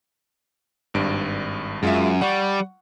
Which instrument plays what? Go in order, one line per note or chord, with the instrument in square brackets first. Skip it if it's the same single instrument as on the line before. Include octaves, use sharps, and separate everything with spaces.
[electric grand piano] G#1 G2 D7
[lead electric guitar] F#2 [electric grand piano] G#3 F4 E5
[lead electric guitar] G3 [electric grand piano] F#5 C#6